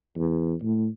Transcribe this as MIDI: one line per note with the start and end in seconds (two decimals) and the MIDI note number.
0.16 0.54 40
0.63 0.87 45